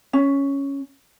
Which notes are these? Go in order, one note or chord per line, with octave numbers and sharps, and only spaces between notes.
C#4